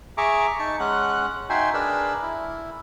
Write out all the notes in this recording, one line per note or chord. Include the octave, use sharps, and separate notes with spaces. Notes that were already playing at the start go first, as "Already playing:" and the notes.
G#4 E5 A#5 C#6 D6
D#4 A5 C#6
G#3 C#4 F#5 F#6
D#4 F#4 E5 G5 G#5 C6
D4 G#4 A#4 B4 D5 E6
E4